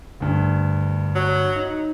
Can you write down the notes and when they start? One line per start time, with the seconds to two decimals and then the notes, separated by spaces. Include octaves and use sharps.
0.20 D2 G2
1.15 F#3
1.56 D#4